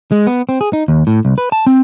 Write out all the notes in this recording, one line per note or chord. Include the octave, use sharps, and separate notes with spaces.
G#3
B3
C4
G#4
D#4
D#2
A2
C2
B4
A5
C4